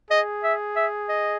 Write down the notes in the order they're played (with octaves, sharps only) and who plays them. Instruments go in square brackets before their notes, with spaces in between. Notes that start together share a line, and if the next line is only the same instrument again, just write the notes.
[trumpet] G#4 [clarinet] D#5
[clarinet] E5
E5
D#5